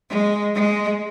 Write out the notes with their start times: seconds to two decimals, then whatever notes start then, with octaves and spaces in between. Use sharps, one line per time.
0.10 G#3
0.55 G#3